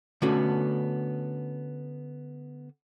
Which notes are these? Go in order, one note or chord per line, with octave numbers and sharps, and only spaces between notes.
D3 A3 B3 C#4 F#4